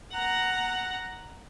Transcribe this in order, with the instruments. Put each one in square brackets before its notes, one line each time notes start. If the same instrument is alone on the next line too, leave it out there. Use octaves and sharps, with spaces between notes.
[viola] F#5 A#5